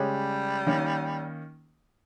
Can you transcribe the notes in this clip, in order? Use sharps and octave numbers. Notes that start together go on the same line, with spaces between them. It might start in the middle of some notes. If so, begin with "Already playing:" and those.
Already playing: C#3 G3 G#3 C#4 G4 C#5
D#3 A#3 C#4